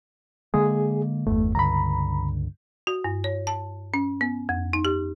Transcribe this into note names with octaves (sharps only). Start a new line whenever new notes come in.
D3 G#3 A#3 G#4
G1 E2 A3
C#2 G2 D3 A#5 B5
F#4
G2
C#5
A5
C#4
B3
F2
D#4
G4